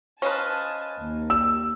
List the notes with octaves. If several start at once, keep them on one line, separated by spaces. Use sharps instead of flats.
C#4 B4 C5 D#5 F5 G#5 A5
D#2
G3 E6